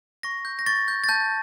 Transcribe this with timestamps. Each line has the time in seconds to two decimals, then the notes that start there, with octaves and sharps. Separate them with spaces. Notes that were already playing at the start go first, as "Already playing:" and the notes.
0.23 C#6 A#6
0.45 G6
0.59 A#6
0.66 C#6 A6
0.88 G6
1.04 A6
1.09 A5 G6